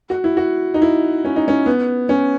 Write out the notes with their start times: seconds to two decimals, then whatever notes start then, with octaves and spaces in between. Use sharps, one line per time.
0.10 F#4
0.24 E4
0.37 F#4
0.74 D#4
0.82 E4
1.25 C#4
1.36 D#4
1.48 C#4
1.66 B3
2.09 C#4